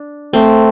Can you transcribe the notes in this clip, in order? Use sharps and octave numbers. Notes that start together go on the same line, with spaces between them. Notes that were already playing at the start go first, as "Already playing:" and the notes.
Already playing: D4
A3 C4